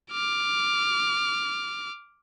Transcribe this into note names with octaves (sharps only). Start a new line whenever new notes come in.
D6 F6